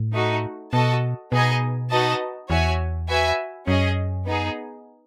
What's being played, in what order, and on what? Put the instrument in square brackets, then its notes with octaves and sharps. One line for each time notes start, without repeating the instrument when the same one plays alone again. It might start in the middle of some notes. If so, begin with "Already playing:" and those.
Already playing: [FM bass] A2
[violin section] A3 D#4 F#4
[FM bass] B2 [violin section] F#4 A4 D#5 A5
[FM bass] B2 [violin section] B3 D#4 G#4 D#5 G#5
[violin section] D#4 F#4 B4 D#5 A5
[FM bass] E2 [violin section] F#4 C#5 E5 G#5
[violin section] F#4 B4 E5 G#5
[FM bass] F#2 [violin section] C#4 G#4 D#5
[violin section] B3 D#4 G#4